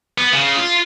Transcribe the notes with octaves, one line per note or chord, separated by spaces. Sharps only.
B3
C#3
F4